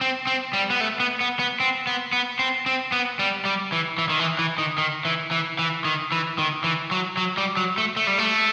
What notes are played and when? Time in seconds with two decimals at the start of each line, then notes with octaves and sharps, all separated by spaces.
0.01 C4
0.27 C4
0.53 G3
0.70 B3
0.81 A3
1.00 B3
1.21 B3
1.39 B3
1.60 C4
1.87 B3
2.13 B3
2.39 C4
2.66 C4
2.92 B3
3.19 G3
3.45 G3
3.72 E3
3.98 E3
4.10 D#3
4.19 E3
4.39 E3
4.58 D#3
4.78 D#3
5.05 E3
5.31 E3
5.59 E3
5.85 D#3
6.12 E3
6.38 D#3
6.64 E3
6.91 F#3
7.17 F#3
7.37 G3
7.57 F#3
7.78 A3
7.97 A3
8.07 G3
8.18 A3